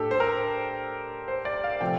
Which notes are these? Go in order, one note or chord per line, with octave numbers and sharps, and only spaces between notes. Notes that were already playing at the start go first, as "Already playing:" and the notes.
Already playing: A2 A3 D4 G4 A4
C5
A#4
C5
D5
F5
C3 F3 A3 C4 G5